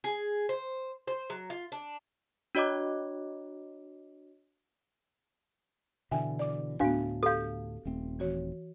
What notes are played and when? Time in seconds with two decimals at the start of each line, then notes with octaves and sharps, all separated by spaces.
0.04 G#4
0.49 C5
1.07 C5
1.30 F#3
1.50 F4
1.72 D4
2.55 D4 F#4 C#5 D#5 A#5 D6
6.11 B2 D3 E3 E5 G5 G#5
6.39 D5 D6
6.80 D2 A2 A3 B3 D4 F#4 F5
7.23 G4 A4 F5 G6
7.85 D#1 A3 C4
8.19 E3 F#4 C#5